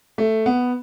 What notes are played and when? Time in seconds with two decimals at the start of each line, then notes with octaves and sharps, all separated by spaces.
0.18 A3
0.46 B3